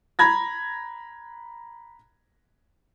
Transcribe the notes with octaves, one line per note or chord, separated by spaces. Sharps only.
A#5 B5 G#6 A#6